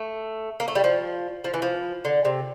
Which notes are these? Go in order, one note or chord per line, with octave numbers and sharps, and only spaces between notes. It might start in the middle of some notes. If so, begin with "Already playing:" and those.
Already playing: A3
A#3
A3
G3
F3
F3
E3
F3
D3
C3